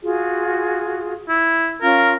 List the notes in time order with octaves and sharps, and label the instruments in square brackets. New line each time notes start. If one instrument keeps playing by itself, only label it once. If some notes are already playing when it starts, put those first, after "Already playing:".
[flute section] F4 F#4 G#4
[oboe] E4
[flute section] C#4 F4 F5 [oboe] A#4